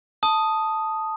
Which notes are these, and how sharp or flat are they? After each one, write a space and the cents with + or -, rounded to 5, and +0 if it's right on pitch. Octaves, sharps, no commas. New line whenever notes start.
A5 +0 D#6 +0